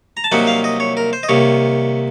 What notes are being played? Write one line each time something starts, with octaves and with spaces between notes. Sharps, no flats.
A#5
A5
C2 C3 F#3 A#3 D#4 F#5
F5
D#5
C#5
A#4
C5
D#5
C2 C3 D#3 A#3 C#5